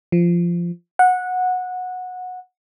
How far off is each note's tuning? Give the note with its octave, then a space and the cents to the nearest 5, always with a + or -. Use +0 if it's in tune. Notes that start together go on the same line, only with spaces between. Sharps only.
F3 -15
F#5 -15